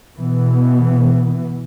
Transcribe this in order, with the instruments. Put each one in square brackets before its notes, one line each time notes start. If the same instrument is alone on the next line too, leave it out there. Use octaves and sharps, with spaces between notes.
[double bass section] B2 E3 B3